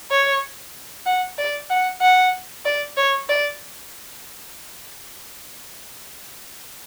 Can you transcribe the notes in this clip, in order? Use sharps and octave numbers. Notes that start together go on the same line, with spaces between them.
C#5
F#5
D5
F#5
F#5
D5
C#5
D5